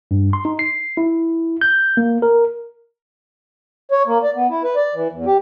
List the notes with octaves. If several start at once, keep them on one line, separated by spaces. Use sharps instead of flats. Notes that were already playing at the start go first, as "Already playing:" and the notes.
G2
C6
D#4
C7
E4
G6
A#3
A#4
C#5
A#3
D5
B3
E4
B4
D5
E3
E2
G4